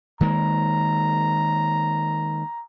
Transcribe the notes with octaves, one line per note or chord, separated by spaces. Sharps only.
D#3 G#3 A#3 A#5